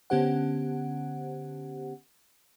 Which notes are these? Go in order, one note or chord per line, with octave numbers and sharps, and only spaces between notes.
D3 B3 C#4 G4 C5 F#5